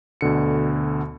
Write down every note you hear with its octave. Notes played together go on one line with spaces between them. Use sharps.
D2 B2 D3 C#7